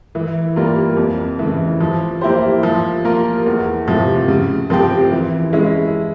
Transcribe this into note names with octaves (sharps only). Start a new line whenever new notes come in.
E3
G3 A#3 F4 A#4
F2
C#3 E3
F3
A#3 E4 G4 C5
F3
A#3 F4 A#4
E2
C3 F3
C#3
F3 C4 G4
E3
G#3 C#4 E4